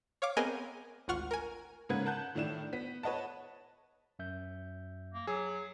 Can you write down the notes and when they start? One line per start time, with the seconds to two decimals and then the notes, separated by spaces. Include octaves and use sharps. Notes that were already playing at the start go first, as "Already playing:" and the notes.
0.22 C#5 F5 D6
0.37 B3 C4 G#4 A#4 D#5 G#5
1.08 G#1 D2 F4 F#5 C#6 F6
1.31 A#4 G#5
1.89 G#2 C#3 A#3 B4 F#5 G#6
2.05 A#4 F#5 A5 F#6 G6
2.35 A2 D#3 E3 D4 E4 E7
2.73 B3 B6
3.03 B4 C#5 D#5 F#5 A5
4.19 F#2 E5 G6
5.14 A#3
5.27 F#3 G#4 E6